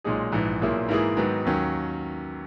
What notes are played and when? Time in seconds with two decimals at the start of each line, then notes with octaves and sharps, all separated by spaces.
0.04 B1 A#2 G#3 D#4 G#4
0.32 A#1 G#2 E3
0.61 B1 A#2 A#3 E4 G#4
0.89 G#2 E3 A#3 E4 G#4
1.17 G#2 D#3 F#3 B3 D#4
1.45 D#2 D#3 F#3 C#4